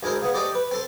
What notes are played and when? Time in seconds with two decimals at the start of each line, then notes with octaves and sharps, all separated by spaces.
0.03 D2 G#3 E4 A#4 C5
0.22 C#3 B3
0.34 A3 G4 C5 D5 D#5 G5
0.55 B4
0.71 C4 A4 C6